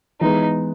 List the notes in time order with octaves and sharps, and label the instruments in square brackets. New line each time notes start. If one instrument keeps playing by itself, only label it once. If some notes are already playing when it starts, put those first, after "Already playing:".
[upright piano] E3 G#3 B3 [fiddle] D#4